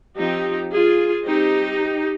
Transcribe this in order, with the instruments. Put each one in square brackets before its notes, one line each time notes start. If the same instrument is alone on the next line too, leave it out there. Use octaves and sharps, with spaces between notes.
[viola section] F3 C4 D#4 G4
F4 G#4
G3 C4 D#4 G4